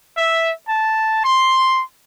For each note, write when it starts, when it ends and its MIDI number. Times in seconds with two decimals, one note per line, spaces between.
0.16 0.50 76
0.68 1.22 81
1.24 1.81 84